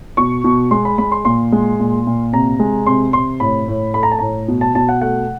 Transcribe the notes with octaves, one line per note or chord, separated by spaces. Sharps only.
B2 C#6
B2
G#3 C6
B5
G#3 B5
C6
A#2 C6
G#3
A#2
A#2
C3 A#5
G#3
C3 C6
C3 C6
A2 B5
A2
A3 B5
A#5
A5
A2 A#5
B2
A5
B2 A5
F#5
A3 F#5